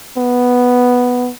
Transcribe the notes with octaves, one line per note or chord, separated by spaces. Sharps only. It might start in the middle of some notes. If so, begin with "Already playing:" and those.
B3